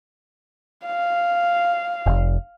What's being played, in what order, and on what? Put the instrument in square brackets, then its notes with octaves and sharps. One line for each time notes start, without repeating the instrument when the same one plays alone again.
[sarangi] F5
[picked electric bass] F1